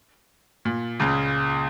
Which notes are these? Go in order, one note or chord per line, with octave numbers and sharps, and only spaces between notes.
A#2
C#2 C#3